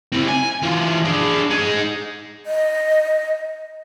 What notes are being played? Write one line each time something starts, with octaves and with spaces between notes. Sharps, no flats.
C4 E4
G#5
E3 F4
D4 G#4
D#4 G#4
D#5